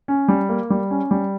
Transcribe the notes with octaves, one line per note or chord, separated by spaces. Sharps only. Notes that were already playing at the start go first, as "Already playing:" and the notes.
C#4
G3
A#3
G3
C#4
G3